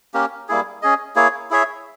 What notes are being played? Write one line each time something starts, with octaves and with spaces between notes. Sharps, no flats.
A#3 C#4 G4 A#4
G3 A#3 E4 G#4
C#4 G#4 D#5
A#3 E4 G#4 C#5
E4 G#4 C#5 E5